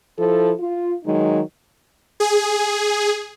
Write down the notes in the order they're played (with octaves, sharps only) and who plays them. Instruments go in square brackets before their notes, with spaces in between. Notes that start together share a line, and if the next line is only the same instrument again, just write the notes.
[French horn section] F3 E4 A4
F4
D#3 F#3 G#3 D#4
[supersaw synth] G#4